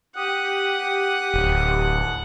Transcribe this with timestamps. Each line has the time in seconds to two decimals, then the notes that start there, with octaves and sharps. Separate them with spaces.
0.16 G4 F#5 D#6
1.34 D1